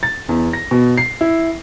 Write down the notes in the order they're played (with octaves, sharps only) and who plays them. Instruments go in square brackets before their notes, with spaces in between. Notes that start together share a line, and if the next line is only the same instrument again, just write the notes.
[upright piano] A6
E2
A#6
B2
C7
E4